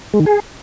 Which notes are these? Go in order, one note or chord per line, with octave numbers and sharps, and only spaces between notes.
G#3
D#3
G#4